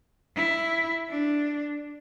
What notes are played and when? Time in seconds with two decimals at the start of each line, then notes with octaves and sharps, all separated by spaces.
0.36 E4
1.09 D4